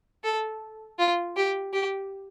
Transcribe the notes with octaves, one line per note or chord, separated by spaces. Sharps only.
A4
F4
G4
G4